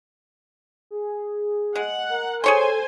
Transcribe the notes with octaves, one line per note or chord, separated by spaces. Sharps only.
G#4
G#3 F#5
A#4
G#4 A4 C5 C#5 G#5 C6